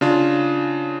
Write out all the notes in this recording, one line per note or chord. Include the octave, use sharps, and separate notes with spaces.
C#3 D4 F4